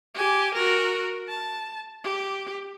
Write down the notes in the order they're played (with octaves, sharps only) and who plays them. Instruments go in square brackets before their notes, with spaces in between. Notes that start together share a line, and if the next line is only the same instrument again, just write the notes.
[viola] G4 G#5
F#4 A#4
A5
G4